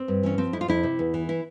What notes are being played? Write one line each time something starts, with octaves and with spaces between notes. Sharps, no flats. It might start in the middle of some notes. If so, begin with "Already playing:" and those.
Already playing: C4
G2
E3 C#4
F3 C4
F2 E4
F4
F2 E4
C3
E2
E3
E4